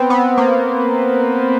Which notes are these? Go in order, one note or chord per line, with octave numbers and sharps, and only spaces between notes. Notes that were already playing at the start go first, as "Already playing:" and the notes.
Already playing: B3 C4
B3
A#3